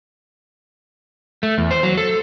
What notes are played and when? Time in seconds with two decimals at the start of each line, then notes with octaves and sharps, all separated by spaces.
1.43 A3
1.58 E2
1.71 C5
1.83 F#3
1.97 A4